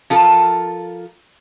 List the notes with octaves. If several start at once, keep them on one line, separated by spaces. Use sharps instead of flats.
F3 F4 A4 A#4